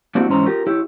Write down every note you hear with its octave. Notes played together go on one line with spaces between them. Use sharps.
A#3 C4 D4 E4 F#4 G4
G#2 E3 C#4 C5 A#5
F4 G4 A#4
E4 G4 C#5